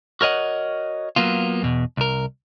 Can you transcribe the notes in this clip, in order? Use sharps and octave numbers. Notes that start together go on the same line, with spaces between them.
F#4 A#4 C#5 D#5 F#5
F#3 A#3 B3 F4
E2 B2
C2 A#4